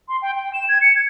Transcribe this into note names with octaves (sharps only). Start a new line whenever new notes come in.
C6
G5
G5
E7
G#6
C#7
G#6